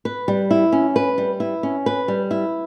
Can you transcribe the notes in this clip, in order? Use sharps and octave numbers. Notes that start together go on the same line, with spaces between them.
B4
G3
E4
C#4
B4
G3
E4
C#4
B4
G3
E4